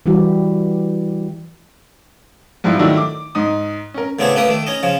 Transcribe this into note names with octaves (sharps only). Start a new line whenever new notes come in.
E3 G3 E4 F#4 G4
G#2 F3 G3 E4
D#3 F#3 G3 A3 D4 E4
D6
G#2 D#4 D#6
C#4 A#4
A2 C#3 B3 C4 D4 C#5
A3 A#3 G4 B4 D#6
D#3 A3
C#4 D#4 D#5
C#3 F3 C#4